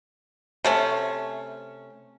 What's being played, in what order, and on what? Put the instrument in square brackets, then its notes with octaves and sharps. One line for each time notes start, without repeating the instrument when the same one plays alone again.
[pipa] C3 A3 C#4